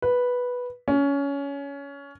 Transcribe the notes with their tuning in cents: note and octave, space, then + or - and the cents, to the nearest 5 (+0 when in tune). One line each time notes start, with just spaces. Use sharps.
B4 -5
C#4 +20